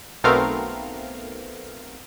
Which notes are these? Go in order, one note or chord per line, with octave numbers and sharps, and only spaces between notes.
B1 A3 B3 C4 A#4 F5